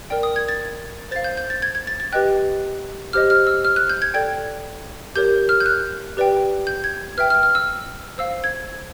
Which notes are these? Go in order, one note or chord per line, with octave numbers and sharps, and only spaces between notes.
A#4 D5 G5
D#6
G#6
A6
C5 F5 A6
G6
G6
A6
G#6
G#6
A6
A6
G4 B4 D#5 G5 F#6
G4 C5 D#5 F6
F6
E6
F6
F#6
G6
G#6
A4 D5 G5 G#6
G4 A#4 C#5 G6
F6
G6
F#6
G4 B4 D5 G5
G6
G#6
B4 E5 G5 F6
F6
F6
E6
C5 F5 E6
G#6